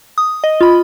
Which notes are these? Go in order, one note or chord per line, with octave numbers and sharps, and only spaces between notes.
D#6
D#5
F4 B5